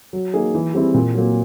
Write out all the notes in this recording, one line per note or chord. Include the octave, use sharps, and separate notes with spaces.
F#3
A#3 D#4 G#4
E3
G3 C4 E4 G#4
A#2
F#3 A#3